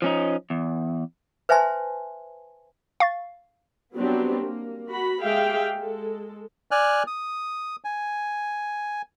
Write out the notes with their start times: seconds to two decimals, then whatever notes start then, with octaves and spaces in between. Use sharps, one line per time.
0.02 F3 C#4 D#4
0.50 E2
1.49 B4 C5 E5 G#5 A5 C6
3.00 F5 C#6 A6
3.93 F#3 G3 B3 C4 D4 G4
4.41 A#3
4.89 F#4 B5
5.21 G#3 G4 G#4 E5 F5 G5
5.78 G#3 A4
6.71 D5 G#5 F6 F#6
7.07 D#6
7.84 G#5